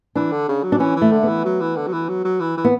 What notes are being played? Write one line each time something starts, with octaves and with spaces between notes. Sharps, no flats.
E3 D4
D3
C#3
F#3
D4
E3 C#4
E3
A3
D3
B3
E3
F#3
E3
D3
F#3
E3
F#3
F#3
E3
E3
B3